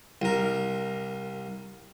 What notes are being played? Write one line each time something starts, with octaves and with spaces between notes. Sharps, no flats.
C2 A#4